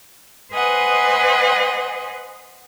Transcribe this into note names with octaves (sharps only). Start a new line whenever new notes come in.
B4 C5 D#5 F#5 G#5